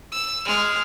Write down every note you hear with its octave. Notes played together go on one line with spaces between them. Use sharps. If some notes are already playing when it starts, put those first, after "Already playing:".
E6
G#3 F6